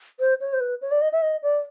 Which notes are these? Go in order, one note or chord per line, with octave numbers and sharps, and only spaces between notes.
C5
C#5
C5
B4
C#5
D5
D#5
E5
D#5
D5